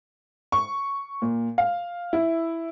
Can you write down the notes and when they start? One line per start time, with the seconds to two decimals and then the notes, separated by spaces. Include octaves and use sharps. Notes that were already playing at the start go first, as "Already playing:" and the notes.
0.52 C#6
1.22 A#2
1.58 F5
2.13 E4